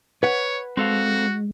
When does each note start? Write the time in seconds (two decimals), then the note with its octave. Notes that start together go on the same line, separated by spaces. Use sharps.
0.23 B4 C#5 F#5
0.77 G#3 C4 F#4 A4 F5